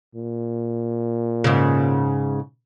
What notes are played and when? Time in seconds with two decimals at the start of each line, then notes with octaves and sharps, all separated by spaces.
0.15 A#2
1.44 G#2 C#3